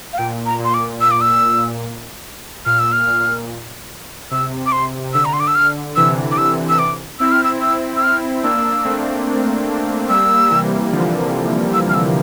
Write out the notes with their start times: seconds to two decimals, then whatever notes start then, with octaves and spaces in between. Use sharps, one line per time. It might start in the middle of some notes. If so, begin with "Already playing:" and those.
0.13 F5
0.18 A#2 G5
0.46 A#5
0.59 A#2
0.64 C6
0.74 D6
1.01 E6
1.11 D6
1.21 E6
2.66 A#2 F6
2.79 E6
2.92 F6
3.07 A#2
4.31 C3 E6
4.66 D6
4.72 C6
5.14 D3 E6
5.25 A#5
5.33 C6
5.40 D6
5.47 E6
5.55 F6
5.96 C3 E3 E6
6.31 D6
6.38 E6
6.69 E6
6.79 D6
7.20 C4 E4 E6
7.32 F6
7.44 E6
7.61 E6
7.97 E6
8.03 F6
8.43 A#3 D4 E6
8.85 A3 C4
10.09 G3 A#3 E6
10.50 C3 E3
10.92 D3 F3
11.74 E6
11.89 F6
11.94 E6